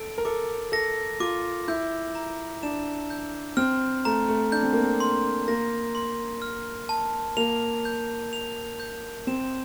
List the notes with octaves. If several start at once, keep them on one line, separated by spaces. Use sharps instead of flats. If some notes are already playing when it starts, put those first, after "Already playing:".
Already playing: A4 D7
A#4
A4 D6
A4 A#6
F4 D6
E4 G6
A#5
D4 E7
G6
C4 F6
A3 A#5
A3
D4 G6
C4
A#3
C4
C6
A#3 A#6
C6
F6
A5
A#3 F7
G6
F7
G6
C4 E7